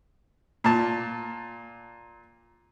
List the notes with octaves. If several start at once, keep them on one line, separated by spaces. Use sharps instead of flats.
A#2 A5